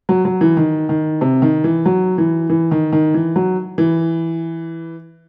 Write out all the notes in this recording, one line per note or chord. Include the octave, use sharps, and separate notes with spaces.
F#3
F#3
E3
D#3
D#3
C3
D#3
E3
F#3
E3
E3
D#3
D#3
E3
F#3
E3